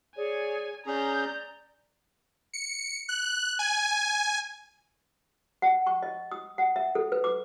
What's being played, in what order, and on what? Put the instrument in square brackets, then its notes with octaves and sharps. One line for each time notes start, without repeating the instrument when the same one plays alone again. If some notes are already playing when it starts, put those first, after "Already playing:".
[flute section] G#4 C#5 D5 [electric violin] G#5
[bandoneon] C#4 G#4 [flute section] D5 [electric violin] A#5 G6
[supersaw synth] C#7
F#6
G#5
[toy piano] F#5
C#6
D#5
D#6
F#5
E5
A4
B4
D6